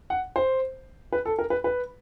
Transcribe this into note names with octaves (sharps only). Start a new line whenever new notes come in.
F#5
C5
B4
A4
A#4
B4
B4